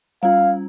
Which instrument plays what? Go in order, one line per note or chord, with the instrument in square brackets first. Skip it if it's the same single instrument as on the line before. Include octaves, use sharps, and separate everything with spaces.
[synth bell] G3 C#4 F4 [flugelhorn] F5